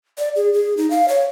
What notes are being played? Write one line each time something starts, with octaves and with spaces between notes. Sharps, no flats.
D5
G#4
G#4
D#4
F5
C#5